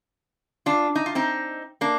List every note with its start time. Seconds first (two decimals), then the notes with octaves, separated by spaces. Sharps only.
0.66 D4 F4
0.95 D#4
1.06 F4
1.15 C4 D#4
1.81 A#3 D4